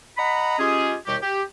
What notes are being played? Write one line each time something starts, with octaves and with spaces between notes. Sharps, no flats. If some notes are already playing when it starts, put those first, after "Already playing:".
D#5 F#5 A#5 B5
G#3 C#4 F4 G4 G#4
D#2 B2 G3 F#4 G4
G4